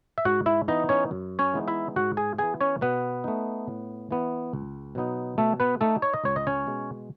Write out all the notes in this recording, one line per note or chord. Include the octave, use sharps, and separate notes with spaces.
E5
G#2 F#4 F#5
E4 E5
E3 B3 D#4 D#5
C#4 C#5
F#2
C#4 C#5
E3 G#3 B3 D#4
E4 E5
G#2 F#4 F#5
G#4 G#5
E3 B3 G#4 G#5
C#4 C#5
B2 B3 B4
A3 D#4
A2
E3 B3
C#2
B2 F#3 B3 D#4
B2 A3 A4
B3 B4
A3 D#4 A4
C#5
D#5
C#2 C#5
D#5
C#4 C#5
B2 G#3